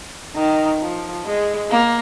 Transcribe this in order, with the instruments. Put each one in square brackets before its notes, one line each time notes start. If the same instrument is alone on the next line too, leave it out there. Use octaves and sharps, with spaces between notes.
[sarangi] D#3
F3
G#3
A#3